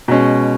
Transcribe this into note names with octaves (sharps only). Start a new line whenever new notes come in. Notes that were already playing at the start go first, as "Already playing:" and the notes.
B2 G#3 C#4